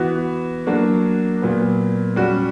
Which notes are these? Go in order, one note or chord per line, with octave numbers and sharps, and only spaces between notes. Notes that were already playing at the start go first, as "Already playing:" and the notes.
Already playing: E3 B3 F#4
F#3 A#3 D4 F#4
A#2 F#3 B3
G3 C#4 F#4